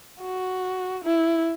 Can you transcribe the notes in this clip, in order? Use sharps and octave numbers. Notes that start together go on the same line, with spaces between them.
F#4
E4